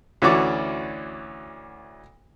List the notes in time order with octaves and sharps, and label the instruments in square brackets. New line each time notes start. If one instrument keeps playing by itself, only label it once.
[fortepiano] D2 E3 C#4 F#4 D5 D6